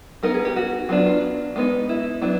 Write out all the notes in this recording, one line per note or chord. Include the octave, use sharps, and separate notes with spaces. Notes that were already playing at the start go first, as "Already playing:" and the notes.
G3 B3 D#4 A#4
G#4
G4
F#4
F#3 B3 D4 F4
F4
G#3 B3 D#4
E4
F#3 B3 D4 E4